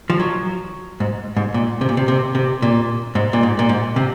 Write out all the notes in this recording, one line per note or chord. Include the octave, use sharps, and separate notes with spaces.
F3
F#3
G#2
G#2
A#2
C3
A#2
C3
C3
C3
A#2
G#2
A#2
G#2
A#2
G#2
C3